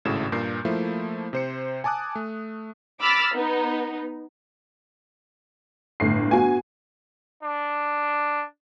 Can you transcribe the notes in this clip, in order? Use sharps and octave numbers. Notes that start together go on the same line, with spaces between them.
G#1 A2 C#3 F#4 E7
G2 A#2 A#4 G6 C7
F3 A3 A#3 E4
C3 C5 C#7
G#5 A5 D6 D#6 F#6
A3
B5 D6 E6 F6 A6
B3 D#4
G1 A2 C7
B3 F#4 G#5
D4